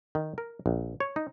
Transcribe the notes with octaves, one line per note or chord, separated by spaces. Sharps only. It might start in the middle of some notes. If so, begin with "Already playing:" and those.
D#3
A#4
A#1
C#5
D#4